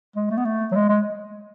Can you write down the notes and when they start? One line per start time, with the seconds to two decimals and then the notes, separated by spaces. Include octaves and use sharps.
0.16 G#3
0.31 A3
0.37 B3
0.45 A3
0.71 F#3
0.75 G#3
0.89 G#3